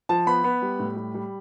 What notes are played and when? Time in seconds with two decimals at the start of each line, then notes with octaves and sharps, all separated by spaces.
0.09 F3 A5
0.27 B3 B5
0.44 B3
0.62 G3
0.79 A2
0.97 G3
1.14 G3